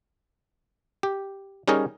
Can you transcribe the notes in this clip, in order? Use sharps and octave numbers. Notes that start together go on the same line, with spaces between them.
G4
G3 C#4 D#4 G#4 A#4 C#5